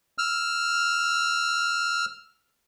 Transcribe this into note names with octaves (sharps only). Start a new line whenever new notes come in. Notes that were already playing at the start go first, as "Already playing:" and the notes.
E6 F6